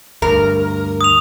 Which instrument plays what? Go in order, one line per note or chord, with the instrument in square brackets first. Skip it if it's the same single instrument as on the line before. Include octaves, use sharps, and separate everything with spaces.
[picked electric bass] D2 G2 [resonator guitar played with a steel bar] A#4
[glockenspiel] D#6 F7